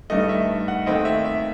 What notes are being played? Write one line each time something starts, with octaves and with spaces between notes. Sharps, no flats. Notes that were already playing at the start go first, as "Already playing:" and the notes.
G2 D#3 A3 D#5
E5
F#5
D#2 D#3 A3 C4 D#5
E5
E5